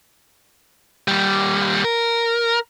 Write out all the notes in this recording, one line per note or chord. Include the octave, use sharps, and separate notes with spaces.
D#2 G3
A#4